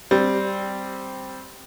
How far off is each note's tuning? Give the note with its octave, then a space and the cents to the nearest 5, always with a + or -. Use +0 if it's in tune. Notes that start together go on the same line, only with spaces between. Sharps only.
G3 +0 C4 +0